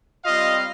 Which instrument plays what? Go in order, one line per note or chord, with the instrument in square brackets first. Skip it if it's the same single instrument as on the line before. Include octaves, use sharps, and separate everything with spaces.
[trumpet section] G3 C4 F4 D#5 F5